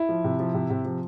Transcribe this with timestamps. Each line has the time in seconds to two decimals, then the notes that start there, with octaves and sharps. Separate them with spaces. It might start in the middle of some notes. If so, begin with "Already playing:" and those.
Already playing: E4
0.09 F3
0.24 C3
0.40 F3
0.54 C3
0.70 C3
0.85 F3